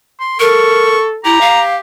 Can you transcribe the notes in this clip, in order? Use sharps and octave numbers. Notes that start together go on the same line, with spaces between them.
C6
A4 A#4 C#6
E4 G4 A#5
F5